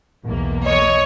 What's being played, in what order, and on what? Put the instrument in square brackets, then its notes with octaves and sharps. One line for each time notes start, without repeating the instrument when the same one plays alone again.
[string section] B1 E2 A#3
[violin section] C#5 [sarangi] D#5